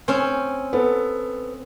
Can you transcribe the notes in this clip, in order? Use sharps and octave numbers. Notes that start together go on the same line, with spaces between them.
C4 C#4
B3 A4